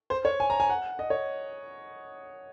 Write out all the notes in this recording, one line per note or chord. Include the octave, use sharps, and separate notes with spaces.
C5
C#5
G#5
A#5
G#5
F#5
D#5
C#5